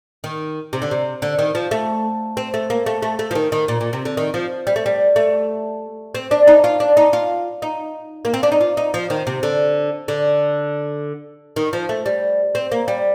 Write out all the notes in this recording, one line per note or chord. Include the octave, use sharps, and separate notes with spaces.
D#3
C3
D3
C3
D3
D#3
F3
A3
C4
A3
A#3
A3
A3
A3
F3
D#3
D#3
A#2
A#2
C3
D3
D#3
F3
G3
A3
G3
A3
C4
D4
D#4
F4
D4
D#4
F4
D#4
A#3
C4
D4
D#4
F4
D#4
F3
D#3
C3
D3
D3
D#3
F3
A3
G3
C4
A#3
G3